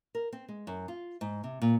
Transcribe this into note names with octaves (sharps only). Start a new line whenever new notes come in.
A#4
C4
G#3
F#2
F4
G#2
C3
A#2